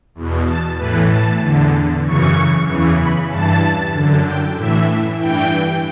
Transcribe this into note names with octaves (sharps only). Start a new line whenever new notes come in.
E2 B2
A5
A2 E3 B4
A5
E2 D3
F#2 C#3 E3 C#6
E2 C#3 E3
B5
G2 E3 A5
F#2 D3
G5
A2 E3 E5
G2 E3 G5